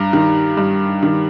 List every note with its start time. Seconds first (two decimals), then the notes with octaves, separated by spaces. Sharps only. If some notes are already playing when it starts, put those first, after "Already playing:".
Already playing: G2 A#5
0.13 D#3
0.57 G2
1.03 D#3